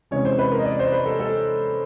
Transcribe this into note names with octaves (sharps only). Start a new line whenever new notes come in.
C3 E3 G#3 C#4 C#5
C5
B4
A#4
D#5
D5
C5
B4
A4
A4